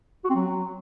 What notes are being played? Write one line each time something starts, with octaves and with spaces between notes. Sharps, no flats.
F#4
C4
F#3